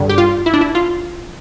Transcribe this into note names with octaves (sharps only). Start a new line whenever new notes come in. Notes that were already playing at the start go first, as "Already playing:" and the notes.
Already playing: G2 D3
G4
F4
E4
D4
E4
F4